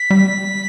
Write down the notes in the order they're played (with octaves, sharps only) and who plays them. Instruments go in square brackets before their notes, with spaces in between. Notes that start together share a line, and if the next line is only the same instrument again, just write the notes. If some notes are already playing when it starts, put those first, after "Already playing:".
Already playing: [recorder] B6
[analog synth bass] G3